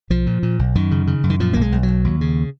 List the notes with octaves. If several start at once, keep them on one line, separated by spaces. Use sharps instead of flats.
B1 F3
A#2
A#2
B1
F#2 D#3
C#3
C#3
F#2
D#3
A#2 F3
B1 A#3
G#3
B1
F#3
B1
D#2
C#3